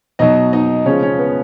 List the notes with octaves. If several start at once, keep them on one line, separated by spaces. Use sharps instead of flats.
B2 F#3 D#4 D#5
D#4 D#5
C#3 F3 G#3 C#4 C#5
C#4 C#5
B3 B4